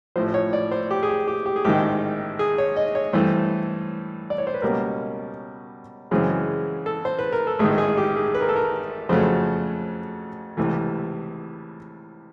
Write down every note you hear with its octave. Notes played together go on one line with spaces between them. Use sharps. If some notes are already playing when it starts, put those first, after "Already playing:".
A1 A2 F3 C5
C#5
D5
C5
G4
G#4
G4
G4
G4
G#4
A1 G#2 D#3 G4
G#4
C#5
D#5
C#5
G2 E3 A3 C4 C5
D5
C#5
C5
B4
C#2 B2 G3 A#3 C#4 A#4
F#2 C#3 E3 G#3 C4
A4
C5
B4
A#4
A4
A1 G#2 D#3 G#4
G#4
G4
G#4
B4
A#4
A4
A#4
F2 C#3 F#3 A3 C5
C#2 C3 E3 A3